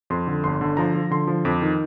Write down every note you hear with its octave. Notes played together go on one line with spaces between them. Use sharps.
F2 C6
D3
G1 C6
D3
F3 A#5
F3
D3 C6
F3
F2 D6
D#3